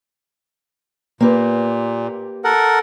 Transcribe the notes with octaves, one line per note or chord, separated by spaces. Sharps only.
A#2 A#3 G4 B4
A4 A#4 F#5